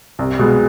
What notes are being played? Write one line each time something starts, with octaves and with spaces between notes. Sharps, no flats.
C2
B2 G#3